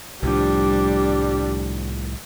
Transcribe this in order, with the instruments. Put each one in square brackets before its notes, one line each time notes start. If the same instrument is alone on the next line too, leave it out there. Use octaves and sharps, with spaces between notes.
[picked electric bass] C2 A2 F3 [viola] G3 D4